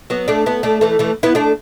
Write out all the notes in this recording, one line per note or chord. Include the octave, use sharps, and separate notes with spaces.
F#3 B3
A3 D4
B3 E4
A3 D4
E3 A3
E3 A3
B3 E4
A3 D4